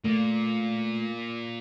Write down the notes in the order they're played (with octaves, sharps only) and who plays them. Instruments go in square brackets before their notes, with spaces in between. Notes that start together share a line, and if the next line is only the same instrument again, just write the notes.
[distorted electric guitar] A#2 [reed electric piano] A3